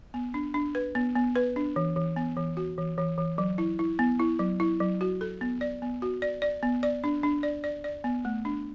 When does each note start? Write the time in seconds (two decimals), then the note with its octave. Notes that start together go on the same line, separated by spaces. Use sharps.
0.14 B3
0.34 D4
0.54 D4
0.75 B4
0.95 B3
1.16 B3
1.36 B4
1.56 D4
1.76 E3
1.96 E3
2.16 B3
2.37 E3
2.57 F#4
2.78 E3
2.98 E3
3.18 E3
3.38 F#3
3.58 E4
3.79 E4
3.99 B3
4.20 E4
4.39 F#3
4.60 E4
4.80 F#3
5.01 F#4
5.21 A4
5.41 B3
5.61 D5
5.82 B3
6.02 F#4
6.22 D5
6.42 D5
6.63 B3
6.83 D5
7.04 D4
7.23 D4
7.43 D5
7.64 D5
7.84 D5
8.04 B3
8.25 A3
8.45 D4